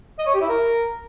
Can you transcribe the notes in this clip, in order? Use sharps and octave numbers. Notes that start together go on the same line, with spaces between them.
D#5
C#5
G4
E4
A#4